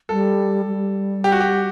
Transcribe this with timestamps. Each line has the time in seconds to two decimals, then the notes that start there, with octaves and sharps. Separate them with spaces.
0.09 G3 A4
0.67 G3
1.24 G4
1.32 F#4
1.40 G4